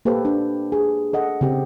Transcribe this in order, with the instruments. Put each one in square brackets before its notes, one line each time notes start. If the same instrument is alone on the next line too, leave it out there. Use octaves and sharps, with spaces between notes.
[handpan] A#3 G4 A4 B4 C5
D4
G#4
A4 D#5 F#5
C#3 C4 G4